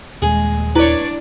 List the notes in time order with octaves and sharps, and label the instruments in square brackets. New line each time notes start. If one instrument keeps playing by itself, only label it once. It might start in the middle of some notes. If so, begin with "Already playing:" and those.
[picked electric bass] D#1 [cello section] G#3 [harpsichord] G#4
[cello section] D4 D5 [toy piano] E4 [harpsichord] B4 C#5